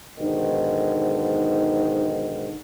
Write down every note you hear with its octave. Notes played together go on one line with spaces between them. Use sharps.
B1 G#2 D3 D#3